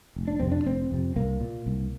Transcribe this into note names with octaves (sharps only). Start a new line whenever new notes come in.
F1
D4
F2 C3 C4
D4
F1 C4
F2 C3
C2 A#3
A#2
C2